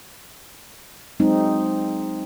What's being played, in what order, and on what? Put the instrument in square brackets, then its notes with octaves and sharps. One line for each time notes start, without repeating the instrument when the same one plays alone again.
[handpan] F#3 G#3 C4 D#4